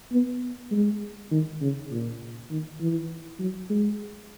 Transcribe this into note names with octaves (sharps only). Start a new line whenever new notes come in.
B3
G#3
D#3
C#3
A#2
D#3
E3
F#3
G#3